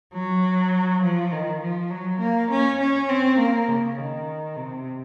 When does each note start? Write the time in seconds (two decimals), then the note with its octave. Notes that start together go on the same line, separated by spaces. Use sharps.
0.14 F#3
1.03 F3
1.32 D#3
1.61 F3
1.91 F#3
2.20 A#3
2.51 C#4
2.80 C#4
3.09 C4
3.38 A#3
3.68 C#3
3.97 D#3
4.56 C3